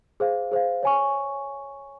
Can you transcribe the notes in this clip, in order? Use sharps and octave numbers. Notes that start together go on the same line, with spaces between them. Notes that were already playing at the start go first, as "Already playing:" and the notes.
G#4 C5 F5
G#4 C5 F5
C#5 G#5 C#6